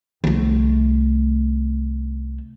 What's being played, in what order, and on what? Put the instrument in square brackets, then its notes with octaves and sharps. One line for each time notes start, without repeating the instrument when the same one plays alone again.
[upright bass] C2 A3